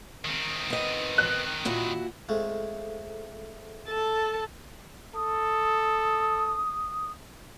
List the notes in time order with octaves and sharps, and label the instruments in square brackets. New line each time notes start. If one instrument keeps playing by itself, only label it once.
[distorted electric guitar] D#3 C4
[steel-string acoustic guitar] B3 D#5
[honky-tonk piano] F#6
[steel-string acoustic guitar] A#2 E4 F#4
[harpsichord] F2 G#3 A3
[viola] A4 A5
[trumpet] A4 [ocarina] D#6